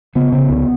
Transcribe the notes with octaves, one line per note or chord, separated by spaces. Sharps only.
C#3 B3
C#3
C#2